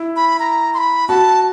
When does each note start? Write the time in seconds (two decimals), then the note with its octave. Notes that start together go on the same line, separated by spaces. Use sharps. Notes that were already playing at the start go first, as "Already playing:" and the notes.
Already playing: E4
0.16 B5
0.40 A#5
0.74 C6
0.78 B5
1.09 F#4 A5